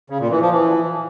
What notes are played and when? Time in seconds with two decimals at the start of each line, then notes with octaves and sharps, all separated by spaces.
0.10 C#3
0.20 A#2
0.31 E3
0.41 F3
0.51 E3